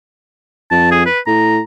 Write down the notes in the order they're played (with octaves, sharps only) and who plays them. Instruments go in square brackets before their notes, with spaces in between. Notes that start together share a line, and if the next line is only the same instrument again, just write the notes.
[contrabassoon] F2 [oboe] A5
[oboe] G#4
B4
[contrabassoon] A2 [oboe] A#5